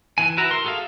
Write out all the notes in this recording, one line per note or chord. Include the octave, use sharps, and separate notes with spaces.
E3 G#5
E4 F#4 B4 E5 A#5
A#4 C6
F#4 G#4 A4 E5 F5